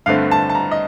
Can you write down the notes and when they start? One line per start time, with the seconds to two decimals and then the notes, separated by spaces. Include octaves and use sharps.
0.06 G2 D3 A3 C4 F5
0.31 A5
0.50 A5
0.55 A#5
0.71 D#5